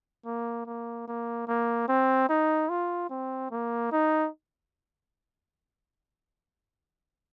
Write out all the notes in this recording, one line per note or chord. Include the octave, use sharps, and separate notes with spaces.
A#3
A#3
A#3
A#3
C4
D#4
F4
C4
A#3
D#4